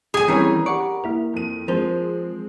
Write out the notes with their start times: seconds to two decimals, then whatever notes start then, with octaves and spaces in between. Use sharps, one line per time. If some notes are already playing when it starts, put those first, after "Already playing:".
0.14 A#1 G#4 G#5
0.28 E3 G3 C4 C#4 A#4 C#5 A#5 B5
0.66 G4 D5 F#5 C#6
1.04 A#3 E4 A#4
1.34 F2 D#7
1.68 F3 G#3 C4 A#4 C5